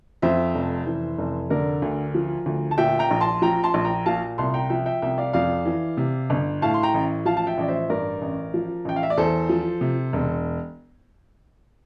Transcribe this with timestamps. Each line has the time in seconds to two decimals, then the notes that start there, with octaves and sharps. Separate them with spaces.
0.22 F2 C5 E5
0.55 F1
0.86 E3
1.18 F1
1.50 D3 A#4 D5
1.82 D2
2.15 F3
2.46 D2
2.71 A5
2.78 A#2 E5 G5
2.99 G5 A#5
3.11 A#1
3.21 A5 C6
3.42 F3 G5 A#5
3.64 A5 C6
3.74 A#1
3.85 G5 A#5
4.06 A#2 F5 A5
4.38 C2 A5 C6
4.54 G5 A#5
4.70 F3 E5 G5
4.86 E5 G5
5.02 C2 E5 G5
5.18 D5 F5
5.33 F2 D5 F5
5.65 E3
5.97 C3
6.30 G1
6.62 A2 F5 A5
6.74 C6
6.83 G5 A#5
6.94 A1
7.25 F3 F5 A5
7.37 A5
7.47 E5 G5
7.58 A1 D5
7.68 C5 E5
7.90 G2 A#4 D5
8.22 A1
8.54 F3
8.85 A1 G5
8.96 F5
9.03 E5
9.10 D5
9.17 E2 A4 C5
9.49 F3
9.81 C3
10.13 E1